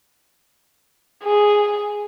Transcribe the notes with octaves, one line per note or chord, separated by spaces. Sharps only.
G#4